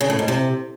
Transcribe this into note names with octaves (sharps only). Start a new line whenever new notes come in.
C#3
A2
G#2
C3